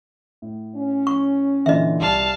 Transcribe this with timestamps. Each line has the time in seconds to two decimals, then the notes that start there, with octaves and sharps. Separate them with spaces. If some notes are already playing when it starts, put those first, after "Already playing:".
0.42 A2
0.76 C#4
1.07 C#6
1.66 A#2 D3 E3 D#5 E5
2.01 C2 F5 A5